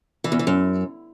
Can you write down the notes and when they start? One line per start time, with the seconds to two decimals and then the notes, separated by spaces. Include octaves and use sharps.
0.24 E3
0.32 E2
0.39 E3
0.47 F#2